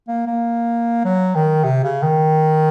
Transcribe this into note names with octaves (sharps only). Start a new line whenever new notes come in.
A#3
A#3
F#3
D#3
C3
C#3
D#3